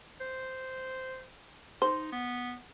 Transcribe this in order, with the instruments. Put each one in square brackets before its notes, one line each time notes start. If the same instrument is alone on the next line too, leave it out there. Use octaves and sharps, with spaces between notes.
[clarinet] C5
[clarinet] D#4 [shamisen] C5
[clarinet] B3